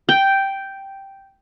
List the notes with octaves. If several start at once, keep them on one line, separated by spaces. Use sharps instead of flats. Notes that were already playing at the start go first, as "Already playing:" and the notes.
G5